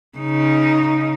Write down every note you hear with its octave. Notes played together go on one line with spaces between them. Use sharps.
C#3 D#4